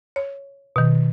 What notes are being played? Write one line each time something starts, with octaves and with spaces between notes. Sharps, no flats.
C#5
B2 D#3